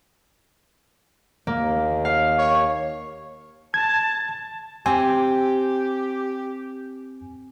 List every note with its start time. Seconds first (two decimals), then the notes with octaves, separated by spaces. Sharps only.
1.47 D#2 A#3
2.05 F5
2.38 C#5
3.74 A5 G#6
4.86 C4 G4 G#5